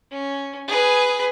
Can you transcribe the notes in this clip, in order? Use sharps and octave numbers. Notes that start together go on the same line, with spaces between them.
C#4
G#4 B4